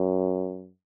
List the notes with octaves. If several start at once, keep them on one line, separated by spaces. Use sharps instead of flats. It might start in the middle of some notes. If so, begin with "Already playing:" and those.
Already playing: F#2